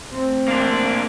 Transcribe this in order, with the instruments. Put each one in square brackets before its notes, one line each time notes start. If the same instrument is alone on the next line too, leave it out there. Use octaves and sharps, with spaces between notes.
[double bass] A3 C4
[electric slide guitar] A#3 D4